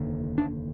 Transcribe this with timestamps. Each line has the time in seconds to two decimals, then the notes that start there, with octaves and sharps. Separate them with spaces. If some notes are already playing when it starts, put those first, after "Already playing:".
Already playing: F1 D#2 D3
0.38 D4